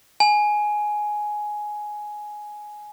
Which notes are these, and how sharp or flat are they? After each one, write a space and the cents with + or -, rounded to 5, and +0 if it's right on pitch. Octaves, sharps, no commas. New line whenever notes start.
G#5 +10